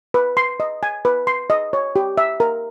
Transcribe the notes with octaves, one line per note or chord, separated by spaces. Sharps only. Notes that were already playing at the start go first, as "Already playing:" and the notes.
B4
C6
D#5
G#5
B4
C6
D#5
C#5
G4
E5
A#4